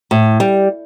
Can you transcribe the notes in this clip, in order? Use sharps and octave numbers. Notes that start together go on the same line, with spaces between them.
A2
G3